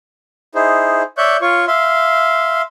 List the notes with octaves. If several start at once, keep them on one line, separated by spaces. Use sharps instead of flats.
D#4 E4 G#4 C5
C#5 D5 E5 C#6 F#6 G6
F4 C#5 C#6
E5 F5 C6